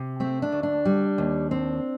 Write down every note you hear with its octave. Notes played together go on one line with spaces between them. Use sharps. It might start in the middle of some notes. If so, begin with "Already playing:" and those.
Already playing: C3
A3 C4
D4
D2
D4
G3
D#2
C4